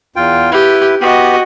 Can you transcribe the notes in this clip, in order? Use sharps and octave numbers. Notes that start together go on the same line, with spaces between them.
E2 F4 G5
E4 G4 B4
B3 F#4 G4 D#5